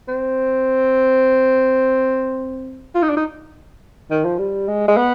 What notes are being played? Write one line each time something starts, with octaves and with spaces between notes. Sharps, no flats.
C4
F4
D#4
D4
D#4
D#3
F3
G3
G#3
G#3
B3